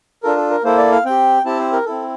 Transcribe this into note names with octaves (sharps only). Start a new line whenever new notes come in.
D4 F4 A4 A#4
A4
A#4
A#3 E4 A4 C5
D5
F5
C4 G4 G5
C4 E4 G4 A5
C5
A#4
C4 E4 A4